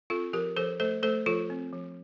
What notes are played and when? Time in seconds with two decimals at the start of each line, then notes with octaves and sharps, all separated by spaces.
0.10 C4 F4 A4
0.33 F3 G4 A#4
0.56 F3 A4 C5
0.80 A3 A4 C5
1.03 A3 A4 C5
1.26 F3 F4 A4
1.50 C4
1.73 F3